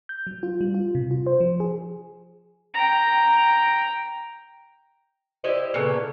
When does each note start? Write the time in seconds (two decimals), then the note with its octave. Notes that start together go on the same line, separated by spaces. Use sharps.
0.09 G6
0.27 F#3
0.43 F4
0.61 G3
0.74 F4
0.95 C3
1.11 F4
1.26 C5
1.41 F3
1.60 G#4
2.74 G5 A#5
5.44 E4 G4 C5 D#5
5.74 A#2 C#3 B3 A4